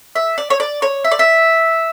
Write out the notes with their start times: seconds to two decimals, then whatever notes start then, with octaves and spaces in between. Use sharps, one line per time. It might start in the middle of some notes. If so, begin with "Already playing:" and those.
0.15 E5
0.38 D5
0.50 C#5
0.60 D5
0.82 C#5
1.04 E5
1.12 D5
1.19 E5